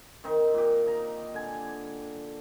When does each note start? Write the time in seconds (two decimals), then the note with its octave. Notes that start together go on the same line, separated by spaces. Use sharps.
0.24 D#3 C4 D#4
0.54 A#2 G4
0.86 D#4 A#5
1.34 D3 G#5